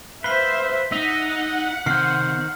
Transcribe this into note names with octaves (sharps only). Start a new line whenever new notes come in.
B4 C5 E5 F5 B6 F#7 G7
D#4 D#5 E5 F#5
C3 D#3 C5 F6 C7